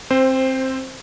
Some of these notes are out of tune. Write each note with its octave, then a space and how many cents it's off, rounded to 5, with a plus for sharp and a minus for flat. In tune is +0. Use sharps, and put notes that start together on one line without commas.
C4 +15 C5 +0